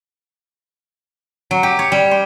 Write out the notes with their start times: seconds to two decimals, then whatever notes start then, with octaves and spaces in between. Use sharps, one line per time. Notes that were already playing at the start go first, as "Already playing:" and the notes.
1.51 F#3
1.63 G4
1.79 C#5
1.92 G3
2.11 C5